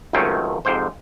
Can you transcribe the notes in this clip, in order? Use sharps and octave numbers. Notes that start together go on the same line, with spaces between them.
C#2 F#2 D#3 A3 C4 C#4
F2 G#2 C3 C5